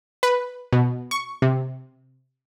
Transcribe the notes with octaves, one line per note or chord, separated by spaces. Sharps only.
B4
B2
C#6
C3